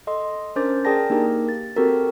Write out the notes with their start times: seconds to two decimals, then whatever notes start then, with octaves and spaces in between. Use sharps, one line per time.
0.07 A4 D#5 C6
0.56 C#4 D4 A#4 C5 D6 A6
0.85 G#4 A#4 D5 G5 A5 A#6
1.10 A#3 D4 D#4 G4 A#4
1.49 A6
1.76 C4 F#4 G4 A4 A#4